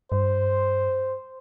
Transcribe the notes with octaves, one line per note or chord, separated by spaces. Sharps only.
G2 C5